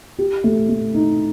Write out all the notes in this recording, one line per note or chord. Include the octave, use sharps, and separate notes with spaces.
G4
A3
A3
D#4